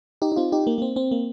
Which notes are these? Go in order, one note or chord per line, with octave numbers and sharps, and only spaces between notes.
D#4 G4
D#4
C4 F4
D#4 G4
A#3
A#3
C4
C4
A#3